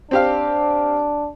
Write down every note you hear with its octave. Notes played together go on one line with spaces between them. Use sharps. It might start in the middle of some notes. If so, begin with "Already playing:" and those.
C4 D4 G4 F5